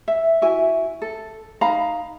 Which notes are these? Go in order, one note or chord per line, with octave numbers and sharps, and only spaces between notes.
E5
E4 F#4 E5 G#5
A4
D#4 F5 A#5 B5